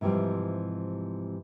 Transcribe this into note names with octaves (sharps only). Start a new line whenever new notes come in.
G#2 C3 E3 F3 G3